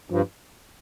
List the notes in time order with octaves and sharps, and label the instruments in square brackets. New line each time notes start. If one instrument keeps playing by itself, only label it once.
[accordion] G2 [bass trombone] F3